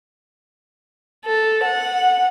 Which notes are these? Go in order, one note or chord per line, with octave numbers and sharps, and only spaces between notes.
A4
F#5